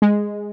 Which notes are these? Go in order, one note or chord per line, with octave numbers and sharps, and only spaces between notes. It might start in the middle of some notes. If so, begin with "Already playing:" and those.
G#3